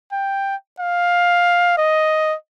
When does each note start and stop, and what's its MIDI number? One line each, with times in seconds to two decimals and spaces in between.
0.12 0.55 79
0.80 1.76 77
1.78 2.35 75